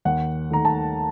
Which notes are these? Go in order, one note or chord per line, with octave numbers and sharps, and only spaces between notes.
D#2 F#5
D#3 A3 A#5
A5